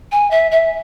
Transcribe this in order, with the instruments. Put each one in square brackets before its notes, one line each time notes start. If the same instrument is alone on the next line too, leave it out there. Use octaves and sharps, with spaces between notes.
[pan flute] G#5
E5
E5